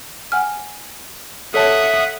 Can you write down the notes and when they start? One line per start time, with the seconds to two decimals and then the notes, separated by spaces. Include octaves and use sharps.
0.32 F#5 G#5 F6
1.54 A4 C#5 E5 F#5 A5 D#6